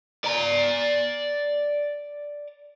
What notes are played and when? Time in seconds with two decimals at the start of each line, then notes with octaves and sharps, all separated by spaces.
0.25 D5 A#5